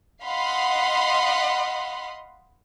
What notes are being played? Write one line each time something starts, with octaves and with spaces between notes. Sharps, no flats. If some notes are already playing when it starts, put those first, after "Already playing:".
D#5 F5 F#5 B5 C6